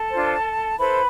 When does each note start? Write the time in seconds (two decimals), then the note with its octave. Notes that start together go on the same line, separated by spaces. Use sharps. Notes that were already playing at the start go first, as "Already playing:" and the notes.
Already playing: A4 A5
0.11 D4 F4 C5
0.77 E4 A4 B4 C5 B5